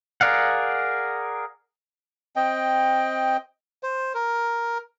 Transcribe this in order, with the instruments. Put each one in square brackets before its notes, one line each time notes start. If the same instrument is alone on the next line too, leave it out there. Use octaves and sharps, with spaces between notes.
[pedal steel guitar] G#4 A#4 D5 F5 F#5
[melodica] C4 D#5 G5
C5
A#4